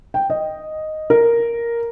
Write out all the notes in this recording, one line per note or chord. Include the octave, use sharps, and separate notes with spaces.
G5
D#5
A#4